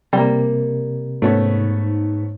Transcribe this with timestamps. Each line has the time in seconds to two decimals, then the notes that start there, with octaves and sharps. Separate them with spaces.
0.13 C3 G3 A#3
1.22 G#2 A3 B3 C#4